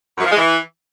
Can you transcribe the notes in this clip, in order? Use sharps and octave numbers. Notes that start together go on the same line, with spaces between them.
F#2
F3
G#3
E3